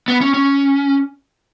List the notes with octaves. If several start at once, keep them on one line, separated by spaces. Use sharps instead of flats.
B3
C#4
C#4